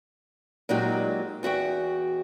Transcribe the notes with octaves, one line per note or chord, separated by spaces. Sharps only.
A#2 F#3 G#3 D#4 F#4 G4
E2 F#4 E5 G5